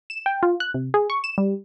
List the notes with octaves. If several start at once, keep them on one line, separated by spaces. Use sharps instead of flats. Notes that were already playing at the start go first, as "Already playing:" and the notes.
E7
G5
F4
F#6
C3
G#4
C#6
E7
G3